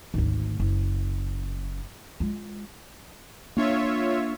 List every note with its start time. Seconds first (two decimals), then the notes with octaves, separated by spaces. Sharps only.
0.14 G#1 D2
0.60 F#1
2.20 G#3 F4
3.57 A#3 D4 F4 C#5 E5